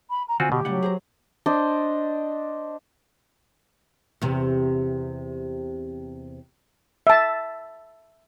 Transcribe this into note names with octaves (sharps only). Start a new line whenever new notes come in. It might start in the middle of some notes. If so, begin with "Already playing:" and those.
B5
A#5
D3 C4 F4 F#4 G#5
B2 G4
A2 C#3 F#3 G3 F#5
G#4 C5 A#5
D4 C5 D#5
E2 C3
E5 A5